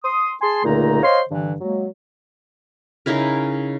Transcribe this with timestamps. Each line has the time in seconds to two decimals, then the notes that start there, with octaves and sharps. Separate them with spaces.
0.05 C6 D#6
0.42 G#4 G#5 A5 C6
0.65 C#2 A#2 D3 A3 D#4 A#5
1.03 C5 C#5 D#5 F5 C6
1.30 G2 D3 E3
1.61 F#3 G#3 A#3
3.06 C#3 D#4 E4 A#4